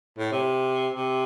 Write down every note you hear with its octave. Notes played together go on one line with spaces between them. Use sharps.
A2
C3
C3